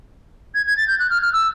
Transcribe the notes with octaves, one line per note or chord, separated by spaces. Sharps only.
G#6
G#6
A6
G6
F#6
F6
F6
E6